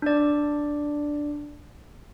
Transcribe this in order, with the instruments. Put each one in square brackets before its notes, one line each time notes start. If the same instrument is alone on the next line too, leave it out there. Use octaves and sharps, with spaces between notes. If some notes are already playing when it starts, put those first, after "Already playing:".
[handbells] D4 D5